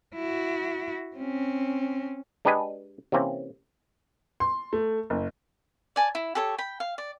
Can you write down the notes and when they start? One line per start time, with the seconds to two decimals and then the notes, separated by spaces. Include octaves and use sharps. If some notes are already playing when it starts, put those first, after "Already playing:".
0.15 E4 F#4
1.17 C4 C#4
2.45 G#3 D4 G4 B4 D#5 G#5
3.12 C3 E3 A#3 C4 C#4
4.40 C6
4.73 A3
5.10 F#1
5.96 D5 G#5 A5
6.15 E4
6.35 G4 A4 C#5
6.58 G5 B5
6.80 F5
6.98 D5